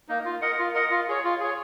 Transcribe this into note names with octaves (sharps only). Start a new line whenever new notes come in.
A#3 D#4
F4
A#4 D#5 F#5
F4
A#4 D#5 F#5
F4
G#4 C#5
F4
G#4 C#5